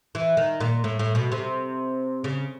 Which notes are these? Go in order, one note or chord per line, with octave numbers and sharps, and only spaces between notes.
E3
D#3
A#2
A2
A2
B2
C3
C#3